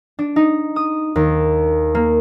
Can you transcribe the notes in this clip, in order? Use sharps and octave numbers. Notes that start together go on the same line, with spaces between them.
D4
D#4
D#6
D#2
A#3